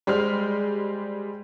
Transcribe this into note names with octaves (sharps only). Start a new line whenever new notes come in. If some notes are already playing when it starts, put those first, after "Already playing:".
G3 G#3 C5 F6